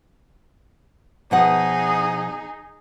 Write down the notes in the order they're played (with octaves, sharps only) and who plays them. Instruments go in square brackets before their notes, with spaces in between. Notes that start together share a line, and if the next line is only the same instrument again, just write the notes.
[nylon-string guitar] B2 F3 F#5 [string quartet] D#4 G#4